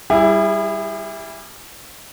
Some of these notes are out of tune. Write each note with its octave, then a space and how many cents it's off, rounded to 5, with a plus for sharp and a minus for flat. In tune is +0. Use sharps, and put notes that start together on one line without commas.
G3 +0 E4 +0 G#4 -40